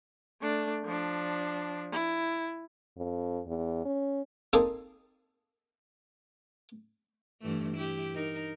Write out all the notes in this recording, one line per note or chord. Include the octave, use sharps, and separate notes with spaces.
A3 D4
F3 D4
E4
F2
E2
C#4
A#3 C4 D#4 G#4 A4 C5
G2 E3 A3
E4 G4
D#4 A#4